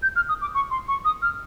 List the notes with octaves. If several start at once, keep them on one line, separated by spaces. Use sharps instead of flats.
G6
F6
D#6
D6
C#6
C6
C#6
D#6
F6